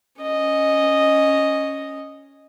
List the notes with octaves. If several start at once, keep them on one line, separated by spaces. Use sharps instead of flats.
C#4 D#5